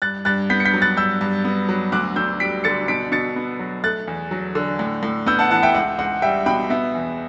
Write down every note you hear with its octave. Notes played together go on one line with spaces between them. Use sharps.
G2 F#6 A6
G2 F#6 A6
B3 G6 B6
C#7
G6 B6
F#3
F#6 A6
G2 E6 G6
G2
B3
F#3
D2 D6 F#6
D2 E6 G6
G3 B6 D7
D3 A6 C#7
B2 B6 D7
B2 A6 C#7
B3
F#3
A3 F#6 A6
E2
F#3
D3
A2
A2
B3 E6 G6
F#5 A5
E3 F#5 A5
E5 G5
C#2 F#5
C#2 F#5
G3 E5 G5
B2 G5 B5
B3 E5
E2